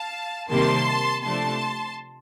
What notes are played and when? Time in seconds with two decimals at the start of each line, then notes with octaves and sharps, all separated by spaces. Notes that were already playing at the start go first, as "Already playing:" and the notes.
Already playing: F5 A5
0.50 C3 D#3 G3 A#3 A5 C6
1.23 C3 F3 A3 D4 A5 C6